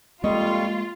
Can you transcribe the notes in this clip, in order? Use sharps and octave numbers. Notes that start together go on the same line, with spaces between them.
F2 G3 G#3 A#3 F4 D#5 C#6